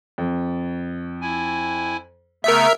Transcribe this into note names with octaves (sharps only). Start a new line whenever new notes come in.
F2
E4 G#5
C#3 A3 B3 A#4 E5